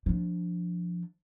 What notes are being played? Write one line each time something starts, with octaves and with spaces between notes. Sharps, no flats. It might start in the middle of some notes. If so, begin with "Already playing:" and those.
F3 D4